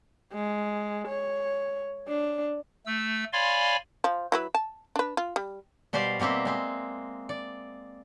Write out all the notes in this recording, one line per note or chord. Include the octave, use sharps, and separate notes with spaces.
G#3
C#5
D4
A3 E6
C#5 D5 F5 G#5 B5 C6
F3
F#3 E4 B4
A5
D4 B4
F4
G3
B2 G3 G4 C5 D5 F5
B2 A#3 C4 G4 E5
G#3 C4
D5